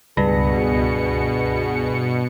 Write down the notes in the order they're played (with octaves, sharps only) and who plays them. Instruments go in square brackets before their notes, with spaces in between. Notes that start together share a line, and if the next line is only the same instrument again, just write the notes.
[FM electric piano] C#2 B5 A#6 [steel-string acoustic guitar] G2 [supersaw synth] B2 C#7 [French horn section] B3 G#4